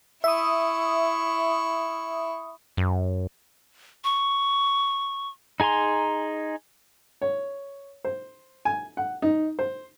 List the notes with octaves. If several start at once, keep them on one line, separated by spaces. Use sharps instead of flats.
E4 E5 C#6 D#6
F#2
C#6
D#4 G#4 G#5 A#5 C6
C#5
C5
G#5
F#5
D#4
C5